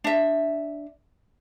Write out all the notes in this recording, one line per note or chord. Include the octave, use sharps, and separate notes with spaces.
D4 E5